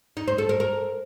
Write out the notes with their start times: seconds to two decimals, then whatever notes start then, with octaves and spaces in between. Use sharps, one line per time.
0.17 D#4
0.28 C5
0.38 A4
0.49 A#4
0.60 A#4